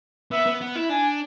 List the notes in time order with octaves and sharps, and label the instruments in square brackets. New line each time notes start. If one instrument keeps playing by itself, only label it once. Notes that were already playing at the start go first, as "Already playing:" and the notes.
[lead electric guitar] B3 [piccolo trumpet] E5
[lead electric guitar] B3
B3
E4
[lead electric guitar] D4 [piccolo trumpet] G#5